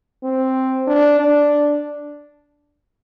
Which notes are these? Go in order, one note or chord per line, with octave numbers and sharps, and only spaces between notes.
C4
D4
D4